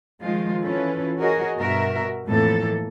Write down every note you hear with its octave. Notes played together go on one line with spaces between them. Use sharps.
D#3 F3 G#3 F4
E3 C#4 F4 A4 B4
F#4 G#4 A#4 C#5 D#5
G2 B2 F#4 A#4 E5
F2 A2 E3 A#3 A4